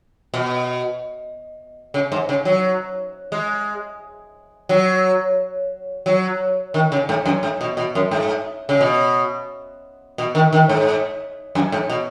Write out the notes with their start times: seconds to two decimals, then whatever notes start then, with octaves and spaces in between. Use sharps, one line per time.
0.34 B2
1.94 C#3
2.12 G#2
2.29 C#3
2.45 F#3
3.32 G#3
4.69 F#3
6.06 F#3
6.74 D#3
6.92 C#3
7.09 G#2
7.26 F#2
7.43 G#2
7.61 B2
7.77 B2
7.95 F#2
8.11 G#2
8.69 C#3
8.81 B2
10.18 B2
10.35 D#3
10.53 D#3
10.69 G#2
11.55 F#2
11.72 G#2
11.90 B2